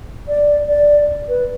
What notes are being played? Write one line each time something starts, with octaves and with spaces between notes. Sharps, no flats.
D5
D5
B4